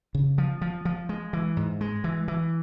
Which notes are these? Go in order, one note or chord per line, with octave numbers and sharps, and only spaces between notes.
C#3
F3
F3
F3
G#3
E3
G#2
G#3
E3
E3